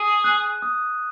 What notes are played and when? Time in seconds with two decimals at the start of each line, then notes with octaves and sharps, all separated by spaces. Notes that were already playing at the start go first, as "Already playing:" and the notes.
Already playing: G#4 D#7
0.24 F#6
0.62 D#6